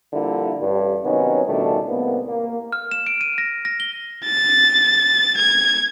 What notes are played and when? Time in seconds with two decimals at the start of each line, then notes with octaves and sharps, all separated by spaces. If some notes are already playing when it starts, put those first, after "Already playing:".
0.13 D3 F3 G3 A#3 E4
0.60 A1 G2
1.04 C3 D#3 F#3 B3 C#4 D#4
1.47 C#2 B2 D#3 G3 A3 D4
1.88 C2 A2 A#3 B3
2.28 A#3
2.72 F6
2.91 E7
3.07 D7
3.21 D#7
3.38 A#6
3.65 A#6
3.80 G7
4.26 A6
5.38 G#6